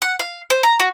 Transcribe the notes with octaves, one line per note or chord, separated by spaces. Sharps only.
F#5
F5
C5
A#5
F#4